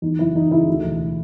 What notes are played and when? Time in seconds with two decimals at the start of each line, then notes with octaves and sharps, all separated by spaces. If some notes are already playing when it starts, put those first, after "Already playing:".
0.02 E2 D#4
0.19 F#1 E4
0.35 E3 D#4
0.51 C#3 E4
0.67 D2
0.84 E1